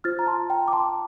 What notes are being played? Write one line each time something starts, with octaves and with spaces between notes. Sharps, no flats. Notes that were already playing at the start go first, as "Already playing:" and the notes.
F4 C5 F6 A6
A#5
A5 C6
G5 A#5
D6
A5 C6